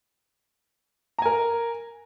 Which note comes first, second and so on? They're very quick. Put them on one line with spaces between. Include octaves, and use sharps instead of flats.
A#5 G#5 A#4